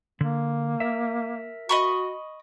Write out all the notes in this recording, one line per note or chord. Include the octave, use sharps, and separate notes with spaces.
D3 A#3
A#4 E5
F#4 D#5 B5 C#6